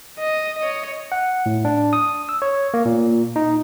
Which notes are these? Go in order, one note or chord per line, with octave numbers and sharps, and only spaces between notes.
D#5
C#5 D#5
F#5
A2
D4
D#6
E6
C#5
A#3
A#2
D#4